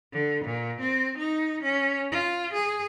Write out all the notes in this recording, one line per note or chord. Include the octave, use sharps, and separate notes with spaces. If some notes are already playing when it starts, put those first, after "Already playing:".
D3
A#2
C4
D#4
C#4
F4
G#4